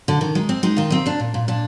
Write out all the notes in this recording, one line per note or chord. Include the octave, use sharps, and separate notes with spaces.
D3
D#3
G#3
C4
G#3 D#4
D#3 F4
C4 D#4
A#2 D4
A#2
A#2
A#2 D4